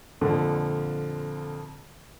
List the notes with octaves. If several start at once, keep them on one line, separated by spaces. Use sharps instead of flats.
F2 A#2 D3 F3